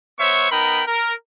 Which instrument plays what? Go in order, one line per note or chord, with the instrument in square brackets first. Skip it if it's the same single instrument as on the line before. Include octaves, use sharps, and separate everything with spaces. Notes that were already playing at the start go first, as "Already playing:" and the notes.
[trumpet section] B3 C5 C#5 E5 C#6
B3 D#4 A#4 G5 B5
A#4